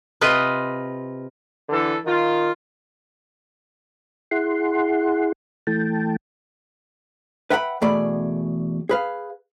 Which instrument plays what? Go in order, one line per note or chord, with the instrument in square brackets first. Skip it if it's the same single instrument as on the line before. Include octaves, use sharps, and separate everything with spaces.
[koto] C3 F4 B4 D#5
[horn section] D3 E3 A4
D#3 F4
[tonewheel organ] E4 G#4 F#5 C6
E3 A3 G5 A5
[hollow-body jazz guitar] B4 E5 F#5 G5 A#5 B5
E2 B2 A3 G#4 D5 B5
G#4 B4 F5